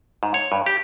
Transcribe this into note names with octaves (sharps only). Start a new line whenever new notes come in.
G#2
C#5
G2
G4